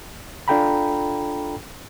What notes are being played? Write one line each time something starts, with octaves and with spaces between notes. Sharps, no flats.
D4 F4 A4 G5 A#5 B5